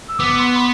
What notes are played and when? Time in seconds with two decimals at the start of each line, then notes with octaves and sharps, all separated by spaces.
0.09 E6
0.19 B3 D6
0.38 C6
0.56 B5